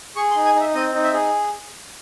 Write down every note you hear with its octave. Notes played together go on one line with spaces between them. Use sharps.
G#4 C#6
C6
D#4
G#5
D#4
E5
C4 D#5
D#4
E5
G#4